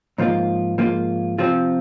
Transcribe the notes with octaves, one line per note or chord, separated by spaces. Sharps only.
G#2 F3 A#3 F4
G#2 F3 A#3 F4
C3 F3 C4 F4